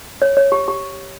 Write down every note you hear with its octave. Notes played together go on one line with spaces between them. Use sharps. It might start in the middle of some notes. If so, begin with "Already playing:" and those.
C#5
C#5
G4
G4